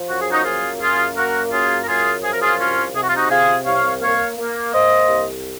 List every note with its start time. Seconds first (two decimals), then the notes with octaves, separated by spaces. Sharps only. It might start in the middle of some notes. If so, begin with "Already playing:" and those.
Already playing: F3
0.09 F#2 F#4
0.20 G#4
0.31 D#4 F#4
0.45 A#3 F4 G#4
0.80 F#2 F4 G#4
1.16 A#3 F#4 A#4
1.52 F#2 F4 G#4
1.83 A#4
1.87 F#2 F4 G#4
2.23 F3 G#4
2.33 A#4
2.41 F4 G#4
2.59 C2 C#4 F4
2.95 C3 G#4
3.02 F#4
3.09 F4
3.16 D#4 F#4
3.30 C3 F4 G#4
3.66 C2 C#5 F5
4.01 A#3 C#5 F5
4.38 A#3
4.73 A#3 C5 D#5
5.09 C2